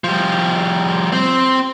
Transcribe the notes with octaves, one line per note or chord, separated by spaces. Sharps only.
F3 G3
C4 C5